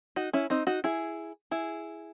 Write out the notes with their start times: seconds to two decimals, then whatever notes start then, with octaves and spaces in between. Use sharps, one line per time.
0.16 D#4 F#4
0.33 C#4 E4
0.50 C4 D#4
0.67 D#4 F#4
0.84 E4 G#4
1.51 E4 G#4